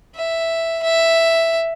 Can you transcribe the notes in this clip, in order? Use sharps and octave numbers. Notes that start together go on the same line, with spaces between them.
E5
E5